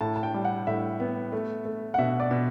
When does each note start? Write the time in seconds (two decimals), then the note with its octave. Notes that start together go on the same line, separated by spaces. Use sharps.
0.01 A2 A5
0.16 A5
0.23 G5
0.34 G3
0.45 F#5
0.67 A2 E5
1.00 B3
1.32 A3
1.65 A3
1.94 F#5
1.99 B2 E5
2.20 D5
2.31 B2